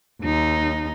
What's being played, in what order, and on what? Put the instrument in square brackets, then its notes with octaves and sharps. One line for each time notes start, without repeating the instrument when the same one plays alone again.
[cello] D#2 D#4